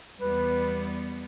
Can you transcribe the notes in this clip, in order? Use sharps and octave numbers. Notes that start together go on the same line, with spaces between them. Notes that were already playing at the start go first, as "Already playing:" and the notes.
E2 G3 B3 B4